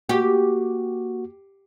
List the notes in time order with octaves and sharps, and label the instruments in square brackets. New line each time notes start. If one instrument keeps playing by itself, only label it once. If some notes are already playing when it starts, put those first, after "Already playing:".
[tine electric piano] A#3 F#4 [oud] G4